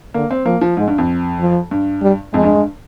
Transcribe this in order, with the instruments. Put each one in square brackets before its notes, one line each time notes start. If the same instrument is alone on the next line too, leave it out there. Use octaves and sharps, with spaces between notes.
[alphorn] D3 [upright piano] A#3
[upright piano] C4
[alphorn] F3 [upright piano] A#3
[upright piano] F3
[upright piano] G#2 [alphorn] G#3
[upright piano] G2
F2
[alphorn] F3
[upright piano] G2
[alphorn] G3
[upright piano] F2 [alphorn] G#3
[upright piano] G2
G2